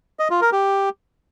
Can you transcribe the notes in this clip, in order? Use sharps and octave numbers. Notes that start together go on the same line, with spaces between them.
D#5
F4
A#4
G4